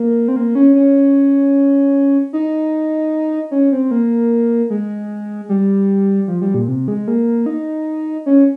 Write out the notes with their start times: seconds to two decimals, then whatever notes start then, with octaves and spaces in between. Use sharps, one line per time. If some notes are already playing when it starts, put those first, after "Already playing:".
Already playing: A#3
0.28 C4
0.36 A#3
0.55 C#4
0.75 C#4
2.33 D#4
3.51 C#4
3.72 C4
3.91 A#3
4.70 G#3
5.49 G3
6.28 F3
6.42 G3
6.54 A#2
6.68 C3
6.88 G#3
7.08 A#3
7.46 D#4
8.26 C#4